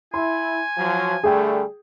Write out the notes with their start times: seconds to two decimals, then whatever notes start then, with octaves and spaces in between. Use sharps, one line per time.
0.14 E4 G#5 C6
0.77 F3 F#3
1.24 D3 G3 A3 G#4 G5